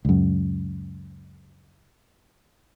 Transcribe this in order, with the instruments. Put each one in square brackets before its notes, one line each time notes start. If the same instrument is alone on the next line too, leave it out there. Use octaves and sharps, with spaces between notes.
[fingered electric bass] C#2 F#2